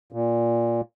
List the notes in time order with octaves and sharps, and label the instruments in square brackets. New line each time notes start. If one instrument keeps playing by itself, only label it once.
[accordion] A#2